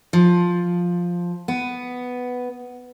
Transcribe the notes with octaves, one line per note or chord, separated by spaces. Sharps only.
F3
B3